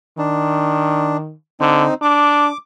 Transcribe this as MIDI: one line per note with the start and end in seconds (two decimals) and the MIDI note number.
0.18 1.34 51
0.18 1.17 62
1.60 1.86 50
1.60 1.94 60
1.60 1.94 63
2.02 2.50 62
2.02 2.57 86